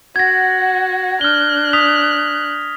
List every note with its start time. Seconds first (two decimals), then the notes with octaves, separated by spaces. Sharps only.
0.16 F#4 F#5 G#6 A#6
1.21 D4 F6 F#6 G7
1.73 D#6 B6 F7